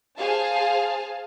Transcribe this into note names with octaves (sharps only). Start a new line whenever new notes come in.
G#4 C5 F5 A5